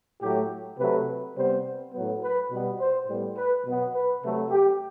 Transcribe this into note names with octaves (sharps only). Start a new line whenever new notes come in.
A2 F#3 A3 G4
C3 F#3 A3 B4
C3 G3 B3 C5
A2 F#3 B3
B4
B2 G3 B3
C5
A2 G3 B3
B4
B2 F#3 B3
B4
C3 F#3 A3
G4